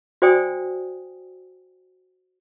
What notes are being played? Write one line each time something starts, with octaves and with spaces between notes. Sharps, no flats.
F#4 C5 D5 G5 G#5 D#6